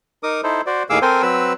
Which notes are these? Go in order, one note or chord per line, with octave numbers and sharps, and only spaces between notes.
D#4 A#4 D6 D#6
D#4 E4 A4 C5
F#4 C5 D5
D#2 A2 G#4 F5 D6 E6
C4 A4 A#4 C5 G5 G#5
F#3 C4 B4 E6